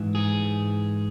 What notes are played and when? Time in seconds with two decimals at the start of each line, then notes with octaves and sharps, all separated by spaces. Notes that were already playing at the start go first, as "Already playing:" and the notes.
Already playing: G#2 E3
0.15 G#4